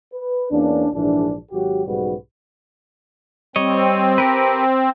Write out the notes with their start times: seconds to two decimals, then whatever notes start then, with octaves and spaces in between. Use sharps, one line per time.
0.13 B4
0.51 E2 A#3 C#4 D4
0.93 A#1 G#2 E3 D4
1.51 G#1 F#3 F#4 G4
1.86 B1 G#2 C#3 G3 F#4 B4
3.56 G3 C4 C#5 D#5
4.18 G4 A#4 B4